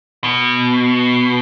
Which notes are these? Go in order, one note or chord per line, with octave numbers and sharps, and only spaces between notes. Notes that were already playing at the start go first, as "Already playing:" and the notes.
B2